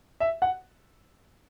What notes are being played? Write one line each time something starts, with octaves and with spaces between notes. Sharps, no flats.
E5
F#5